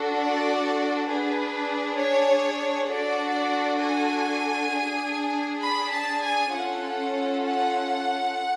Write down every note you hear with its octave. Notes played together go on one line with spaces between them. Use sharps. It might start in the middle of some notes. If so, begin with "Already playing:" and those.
Already playing: D4 F#4 A4
D5
D4 G#4 B4
C#5
D4 F#4 A4 D5
G#5
D4 G#4
B5
A5
G#5
C#4 F4 A4 F#5
F#5